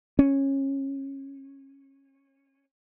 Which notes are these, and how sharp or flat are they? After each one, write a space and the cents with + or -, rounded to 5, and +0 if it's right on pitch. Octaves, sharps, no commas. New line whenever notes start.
C#4 -20